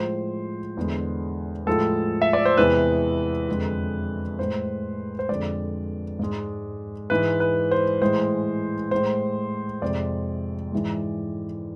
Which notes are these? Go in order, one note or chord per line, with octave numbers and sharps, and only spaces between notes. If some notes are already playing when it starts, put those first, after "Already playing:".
Already playing: A2 F3 G#3 C5
E2 D3 G#3
A2 F3 G#3 A4
E5
D5
C5
E2 C3 E3 G#3 B4
F2 D3 G#3
A2 G#3 C5
C5
F2 D3 G#3 D5
G#2 G#3
G#2 E3 G#3 B4
B4
C5
A2 E3 G#3 C5
A2 G#3 C5
F2 C3 G#3 D5
G#2 E3 G#3